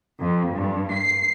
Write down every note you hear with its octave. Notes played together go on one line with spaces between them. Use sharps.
F2
G2
C7